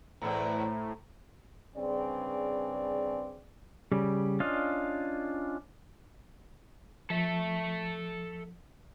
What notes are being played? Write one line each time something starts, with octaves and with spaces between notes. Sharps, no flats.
E2 A2 E4 C5 A#5
G2 C#3 C4 G#4 D5
C#3 G3
C#4 D4 F4 D#5 F5
F3 A4 E5